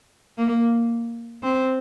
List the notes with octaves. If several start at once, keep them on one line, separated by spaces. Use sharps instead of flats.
A#3
C4